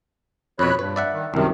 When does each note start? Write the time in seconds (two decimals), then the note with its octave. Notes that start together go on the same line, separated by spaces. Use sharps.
0.59 F2 B2 C#5 B5 F#6
0.79 G2 B4
0.96 D5 E5 F#5
1.13 D#3
1.34 C2 F#2 C3 D#3